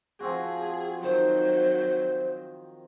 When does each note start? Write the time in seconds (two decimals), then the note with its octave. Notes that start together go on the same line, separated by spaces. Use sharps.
0.20 F3 C4 F#4 G#4
1.03 D#3 F#3 C5